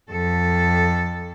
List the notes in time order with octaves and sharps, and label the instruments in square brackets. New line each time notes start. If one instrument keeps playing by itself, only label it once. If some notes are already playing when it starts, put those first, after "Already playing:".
[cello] F2 A4